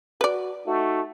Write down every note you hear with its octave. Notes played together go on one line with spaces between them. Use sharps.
F#4 B4 D5
A3 D#4 F#4